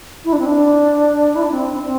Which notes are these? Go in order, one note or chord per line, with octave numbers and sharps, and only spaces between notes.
E4
D4
C4
D4
E4
D4
C4
C4